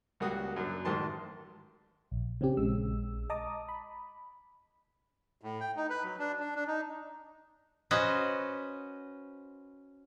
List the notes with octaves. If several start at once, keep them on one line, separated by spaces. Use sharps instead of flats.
C#2 G3 A#3 F#4 D#6
F#2 F#3 A#3 D4
A1 G#2 D#3 A5 C6
A#1
C#3 C4 C#4 G4
A#1 G#3 E6
D#5 A5 A#5 D6 D#6
B5
A2
G5
D#4
B4
F#3
D4
D4
D4
D#4
C#4 F#4 B4 C5 D#5